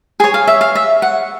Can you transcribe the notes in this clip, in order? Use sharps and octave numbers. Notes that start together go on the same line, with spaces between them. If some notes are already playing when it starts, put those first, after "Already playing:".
G#4 C#5 G#5
F5
E5
F5
E5
F#5